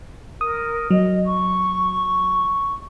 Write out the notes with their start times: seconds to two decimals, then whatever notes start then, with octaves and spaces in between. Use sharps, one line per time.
0.41 A#4 D#6
0.91 F#3 D#5
1.25 C#6